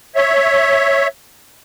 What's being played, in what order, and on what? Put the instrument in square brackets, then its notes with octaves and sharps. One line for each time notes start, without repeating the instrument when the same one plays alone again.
[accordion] C#5 E5